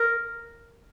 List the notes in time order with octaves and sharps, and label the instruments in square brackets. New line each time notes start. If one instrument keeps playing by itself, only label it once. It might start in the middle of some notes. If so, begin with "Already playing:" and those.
Already playing: [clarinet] A#4